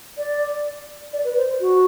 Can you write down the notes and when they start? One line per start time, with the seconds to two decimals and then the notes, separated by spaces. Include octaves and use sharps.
0.17 D5
1.13 D5
1.24 B4
1.37 C5
1.60 F#4